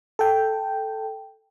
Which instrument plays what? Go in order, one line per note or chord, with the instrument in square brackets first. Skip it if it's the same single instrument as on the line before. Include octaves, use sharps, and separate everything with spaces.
[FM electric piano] A4 G5